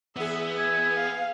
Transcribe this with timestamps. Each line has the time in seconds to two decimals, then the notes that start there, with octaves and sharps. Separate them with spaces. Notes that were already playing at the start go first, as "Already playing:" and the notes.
0.16 E2 B3 G#4 E5
0.59 E5 G#5
0.96 F5